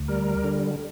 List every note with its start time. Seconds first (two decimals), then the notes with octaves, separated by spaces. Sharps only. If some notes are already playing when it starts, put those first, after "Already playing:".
Already playing: D2
0.08 G3 A#4
0.44 D3